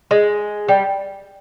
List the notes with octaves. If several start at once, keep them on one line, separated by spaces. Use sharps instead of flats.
G#3
G3